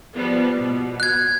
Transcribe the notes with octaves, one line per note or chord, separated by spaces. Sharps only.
F3 G3 B3
B2
F#6 G#6